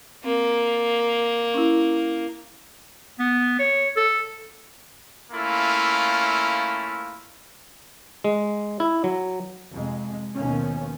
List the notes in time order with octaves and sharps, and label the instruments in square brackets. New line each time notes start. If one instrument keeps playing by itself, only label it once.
[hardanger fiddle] A#3 [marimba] C4
[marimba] C#4 E4
[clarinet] B3
C#5
A4
[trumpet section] A3 A#3 C#4 E4 F4
[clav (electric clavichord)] G#3
E4
F#3
[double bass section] F2 C3 G#3
D#2 B2 D#3 F3 C#4